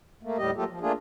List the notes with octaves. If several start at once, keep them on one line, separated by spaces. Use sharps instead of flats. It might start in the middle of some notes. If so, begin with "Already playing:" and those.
A3 A#3
D#2 A2 G3 G4 D#5
F#3 A3 A#3 F4 G4 A4
F3
A3 A#3 D4 F4 G#4